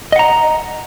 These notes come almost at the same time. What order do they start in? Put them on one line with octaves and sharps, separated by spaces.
D#5 F#5 A#5